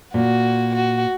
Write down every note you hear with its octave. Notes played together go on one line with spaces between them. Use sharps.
A#2 F#4
F#4